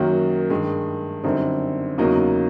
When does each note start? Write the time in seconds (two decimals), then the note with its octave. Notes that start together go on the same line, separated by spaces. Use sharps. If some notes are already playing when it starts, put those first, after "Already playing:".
Already playing: F#2 D#3 F#3 A#3
0.50 G2 D#3 G#3
1.24 F#2 D3 G3 C4 D#4
1.98 E2 C#3 F#3 A#3 D#4